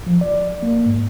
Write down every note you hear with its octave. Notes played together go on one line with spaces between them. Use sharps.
F3
D5
A#3
G#2